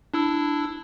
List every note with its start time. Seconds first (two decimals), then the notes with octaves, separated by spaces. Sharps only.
0.14 D4 E4 E6